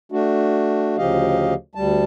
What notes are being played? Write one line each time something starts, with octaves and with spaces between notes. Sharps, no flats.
A3 D4 F#4
D2 C#3 F3 G4 D#5 F5
D2 G3 A5